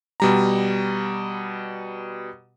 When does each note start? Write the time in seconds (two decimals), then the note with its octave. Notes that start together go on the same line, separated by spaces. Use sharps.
0.20 B2 G3 A#5